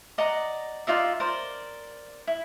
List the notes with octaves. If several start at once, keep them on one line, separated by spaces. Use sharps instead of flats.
D5 D#5 F#5 A#5
D#4 F4 D5 E5
A#4 C5 D5
E4